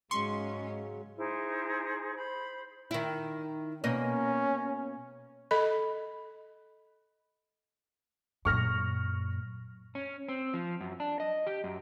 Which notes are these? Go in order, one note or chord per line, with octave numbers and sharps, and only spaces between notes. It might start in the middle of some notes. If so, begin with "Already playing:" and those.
G#2 C#3 F#3 G#3 C#4 C6 C#6
D#4 E4 G#4 C5
C5 B5
D#3 E4
B2 A#3 C#4 D#5
A4 D#5 B5
F#2 A#2 C#6 F6 A#6
C#4
C4
F3
F#2
D4
D#5
G4
F#2